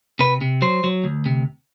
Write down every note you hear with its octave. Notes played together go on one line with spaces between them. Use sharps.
C3 B4
C3
F#3 C5
F#3
D2
C3